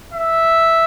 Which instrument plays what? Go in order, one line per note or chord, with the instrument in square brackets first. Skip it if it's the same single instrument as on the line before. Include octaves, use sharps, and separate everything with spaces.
[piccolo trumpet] E5